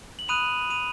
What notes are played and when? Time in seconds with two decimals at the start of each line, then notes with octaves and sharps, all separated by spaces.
0.19 F#7
0.28 B5 D#6 F#6 D#7 F7
0.70 D#7 F7